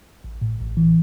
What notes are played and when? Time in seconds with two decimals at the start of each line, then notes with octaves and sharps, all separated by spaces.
0.24 A1
0.42 A2
0.60 A1
0.77 E3